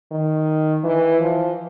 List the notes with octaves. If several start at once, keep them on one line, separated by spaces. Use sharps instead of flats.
D#3
E3
F3